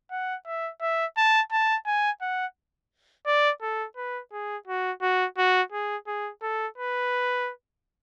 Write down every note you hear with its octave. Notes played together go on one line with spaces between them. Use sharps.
F#5
E5
E5
A5
A5
G#5
F#5
D5
A4
B4
G#4
F#4
F#4
F#4
G#4
G#4
A4
B4